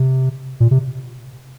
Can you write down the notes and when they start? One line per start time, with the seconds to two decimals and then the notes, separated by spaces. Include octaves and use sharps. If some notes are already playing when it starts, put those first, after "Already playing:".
Already playing: C3
0.60 A#2
0.71 C3